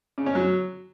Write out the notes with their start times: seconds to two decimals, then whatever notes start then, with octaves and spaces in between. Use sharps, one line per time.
0.18 C#3
0.26 C#4
0.35 F#3